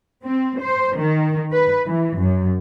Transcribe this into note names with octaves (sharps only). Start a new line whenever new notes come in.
C4
C5
D#3
B4
E3
F#2